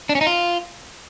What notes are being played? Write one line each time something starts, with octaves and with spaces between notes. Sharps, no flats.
D4
C#4
D#4
F4